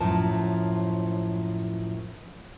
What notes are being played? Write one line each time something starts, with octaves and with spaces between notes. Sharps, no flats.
F#2 A2 F3 A5